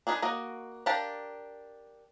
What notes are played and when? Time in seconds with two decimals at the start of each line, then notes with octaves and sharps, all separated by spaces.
0.07 D4 D#4 G#4 A#4 B4
0.22 A#3 F#4 D#5
0.86 D4 G4 A#4 F5 A5